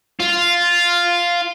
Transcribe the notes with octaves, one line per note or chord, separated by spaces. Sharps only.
F4